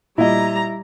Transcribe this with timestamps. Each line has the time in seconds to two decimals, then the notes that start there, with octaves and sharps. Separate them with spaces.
0.18 A#2 G3 E4 D#5 A#5